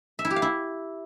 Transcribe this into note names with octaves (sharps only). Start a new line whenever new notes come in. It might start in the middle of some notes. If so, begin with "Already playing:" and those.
E5
E4
G4
F5
E4